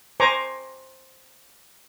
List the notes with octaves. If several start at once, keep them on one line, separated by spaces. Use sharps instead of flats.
C5 G#5 A#5 C#6 D6